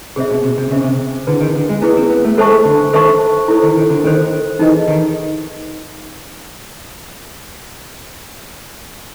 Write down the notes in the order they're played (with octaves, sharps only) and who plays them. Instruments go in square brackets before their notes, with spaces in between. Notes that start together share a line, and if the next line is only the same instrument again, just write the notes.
[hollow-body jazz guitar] C3 [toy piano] G#4 C5 E5
[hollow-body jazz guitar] B2
C3
C3
[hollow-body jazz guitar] C#3 [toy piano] G#4 C5 E5
[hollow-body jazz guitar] C3
[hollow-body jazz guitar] D3 [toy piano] E4 G#4 B4
[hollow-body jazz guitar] D#3
D3
G#3
[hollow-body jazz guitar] B3 [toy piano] E4 G#4 B4
[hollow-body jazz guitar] C4
B3
A3
[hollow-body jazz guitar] G#3 [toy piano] A4 C5 E5 A5 C#6
[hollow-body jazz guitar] D3
[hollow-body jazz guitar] D#3 [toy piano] A4 C5 E5 A5 C#6
[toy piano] E4 A4 C5
[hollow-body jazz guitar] D#3
D#3
D3
[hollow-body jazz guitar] D#3 [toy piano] E4 A4 C5
[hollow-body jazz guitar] E3 [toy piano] D#4 G#4 B4 D#5
[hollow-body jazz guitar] D#3